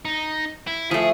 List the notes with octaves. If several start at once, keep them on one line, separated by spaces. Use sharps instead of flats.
D#4
E4
F3 A3 G#4